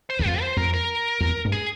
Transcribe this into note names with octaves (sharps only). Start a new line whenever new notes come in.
C5
E2
F2 F4
C5
F2 A#4
A#4
E2
G2
G#4